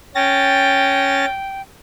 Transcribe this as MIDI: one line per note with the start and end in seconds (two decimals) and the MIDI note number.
0.15 1.25 61
0.15 1.62 79
0.15 1.25 93
0.15 1.25 94